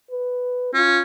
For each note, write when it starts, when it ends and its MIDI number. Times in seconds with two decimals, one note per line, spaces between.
0.11 0.70 71
0.74 1.01 61
0.74 1.02 65